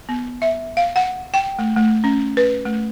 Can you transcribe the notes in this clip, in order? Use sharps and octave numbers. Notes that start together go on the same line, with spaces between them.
B3
E5
F5
F#5
G5
A3
A3
C#4
B4
A3